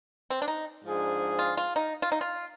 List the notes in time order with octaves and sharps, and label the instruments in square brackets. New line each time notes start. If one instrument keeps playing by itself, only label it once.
[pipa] C4
D4
D#4
[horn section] G#2 F3 G#3 D4 G#4
[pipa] F4
F4
D#4
F4
D#4
F4